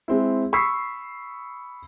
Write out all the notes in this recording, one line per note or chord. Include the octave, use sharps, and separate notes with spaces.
G#3 C4 E4
B5 C#6 D#6 E6 B6 C7